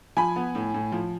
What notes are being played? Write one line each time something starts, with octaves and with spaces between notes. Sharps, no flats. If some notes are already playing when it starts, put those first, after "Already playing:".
F3 G#5 B5
B3
A2
A2
F3